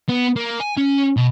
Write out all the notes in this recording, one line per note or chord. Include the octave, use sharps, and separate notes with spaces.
B3
A#3
G#5
C#4
B2